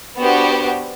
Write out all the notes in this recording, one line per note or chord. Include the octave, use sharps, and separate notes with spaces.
B3 D4 F#4 G4 C5